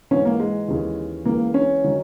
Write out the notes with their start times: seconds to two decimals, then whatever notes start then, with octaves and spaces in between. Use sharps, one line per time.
0.11 G#2 E3 C#4
0.25 A#3
0.40 G#3
0.68 D#2 C#3 E3
1.25 C#2 C#3 E3 A#3
1.54 C#4
1.84 D#3 F#3